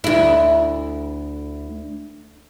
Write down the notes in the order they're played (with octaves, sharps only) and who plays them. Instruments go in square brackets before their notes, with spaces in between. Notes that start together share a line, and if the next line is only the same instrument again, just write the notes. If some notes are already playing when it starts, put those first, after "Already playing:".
[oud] D2 E4